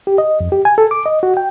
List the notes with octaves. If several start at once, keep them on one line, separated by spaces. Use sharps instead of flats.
G4
D#5
F2
G4
G#5
A4
D6
D#5
F#4
G5